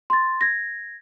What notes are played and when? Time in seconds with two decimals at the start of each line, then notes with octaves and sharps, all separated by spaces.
0.10 C6 A6
0.41 G#6 A#6